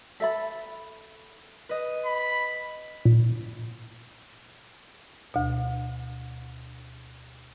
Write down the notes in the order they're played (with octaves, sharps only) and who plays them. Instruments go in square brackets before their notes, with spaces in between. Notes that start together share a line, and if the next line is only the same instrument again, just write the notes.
[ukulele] A4 E5 B5 [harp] A6 B6
[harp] B4 D#5
[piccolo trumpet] B5
[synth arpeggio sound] A#2
[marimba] D2 B2